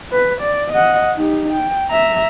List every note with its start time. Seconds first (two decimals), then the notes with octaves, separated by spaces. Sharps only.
0.12 B4
0.41 D5
0.72 D#5 F#5
1.17 D#4 G4
1.52 G5
1.90 E5 A#5